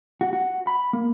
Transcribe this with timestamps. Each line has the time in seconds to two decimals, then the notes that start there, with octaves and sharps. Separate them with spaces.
0.21 F#4
0.33 F#4
0.67 B5
0.93 A#3